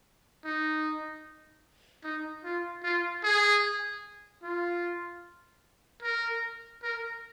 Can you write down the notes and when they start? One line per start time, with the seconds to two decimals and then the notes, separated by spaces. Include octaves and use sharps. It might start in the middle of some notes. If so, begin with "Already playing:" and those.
0.45 D#4
2.04 D#4
2.44 F4
2.84 F4
3.23 G#4
4.43 F4
6.03 A#4
6.83 A#4